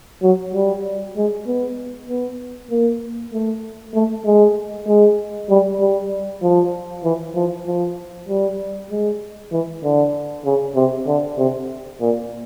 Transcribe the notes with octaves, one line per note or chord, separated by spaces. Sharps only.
F#3
G3
G#3
B3
B3
A#3
A3
A3
G#3
G#3
G3
G3
F3
E3
F3
F3
G3
G#3
E3
D3
C#3
C3
D3
C3
A#2